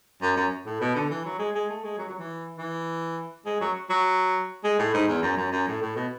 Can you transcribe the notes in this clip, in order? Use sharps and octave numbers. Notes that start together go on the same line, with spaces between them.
F#2
F#2
A2
B2
D3
E3
F#3
G#3
G#3
A3
G#3
F#3
F#3
E3
E3
G#3
F#3
F#3
G#3
A2
G#2
E2
F#2
F#2
F#2
A2
A2
B2